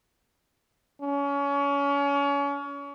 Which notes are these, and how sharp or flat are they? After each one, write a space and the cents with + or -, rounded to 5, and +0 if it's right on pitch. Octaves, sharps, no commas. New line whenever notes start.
C#4 +30